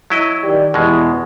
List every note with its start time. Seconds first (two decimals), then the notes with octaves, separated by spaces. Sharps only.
0.10 F#3 E4 D#5
0.43 D#3 G4 D5
0.74 E2 B2 G#3